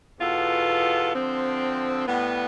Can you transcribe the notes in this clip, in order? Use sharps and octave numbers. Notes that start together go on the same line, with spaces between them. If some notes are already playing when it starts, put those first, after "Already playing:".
E2 B2 B3 F4 A4
D3 F3 C4
A2 G3 B3